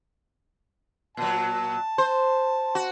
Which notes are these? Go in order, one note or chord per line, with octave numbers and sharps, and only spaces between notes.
A#2 F#3 A5
C5
F#4